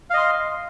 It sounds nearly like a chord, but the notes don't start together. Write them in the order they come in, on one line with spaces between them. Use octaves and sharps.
F5 D#5 C6